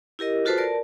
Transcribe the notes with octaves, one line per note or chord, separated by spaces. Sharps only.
E4 G4 A#4 D#5
F4 F#4 A4 B4 C5 A5
A#4 D5 A5